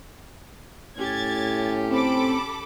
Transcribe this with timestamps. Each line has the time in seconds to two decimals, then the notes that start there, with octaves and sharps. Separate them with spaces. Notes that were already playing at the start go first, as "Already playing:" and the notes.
0.97 A2 C#4 G4 G#6 A6
1.90 C4 A4 B5 D6